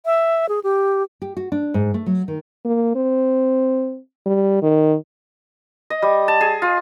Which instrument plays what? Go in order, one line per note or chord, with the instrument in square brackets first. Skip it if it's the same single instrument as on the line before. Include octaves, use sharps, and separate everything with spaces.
[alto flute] E5
G#4
G4
[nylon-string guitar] G4
F#4
D4
G#2
A3
F#3
D#3
[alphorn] A#3
C4
G3
D#3
[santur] D#5
G3
A5
G#4
F4